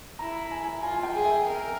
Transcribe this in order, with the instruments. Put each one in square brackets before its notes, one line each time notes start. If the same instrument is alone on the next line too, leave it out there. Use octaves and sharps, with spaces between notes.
[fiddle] E4 [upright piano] A#5
[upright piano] G#5
[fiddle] F4 [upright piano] G#5
[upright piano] G5
[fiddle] G#4
[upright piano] E5
[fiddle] A#4